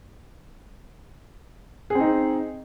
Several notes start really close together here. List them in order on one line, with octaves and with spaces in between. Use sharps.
G#4 C4 D#4